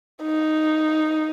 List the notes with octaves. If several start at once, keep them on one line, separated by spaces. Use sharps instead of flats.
D#4